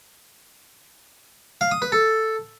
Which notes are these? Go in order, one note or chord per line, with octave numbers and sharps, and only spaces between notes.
F5
D#6
B4
A4